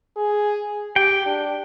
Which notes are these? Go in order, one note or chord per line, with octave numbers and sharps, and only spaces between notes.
G#4
G4 G5
D4